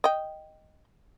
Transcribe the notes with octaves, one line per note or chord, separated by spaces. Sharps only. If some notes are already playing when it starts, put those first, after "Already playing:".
D#5 G5